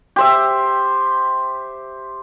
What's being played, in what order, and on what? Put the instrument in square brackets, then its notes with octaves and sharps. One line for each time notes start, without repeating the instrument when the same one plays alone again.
[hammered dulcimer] G4 C5 E5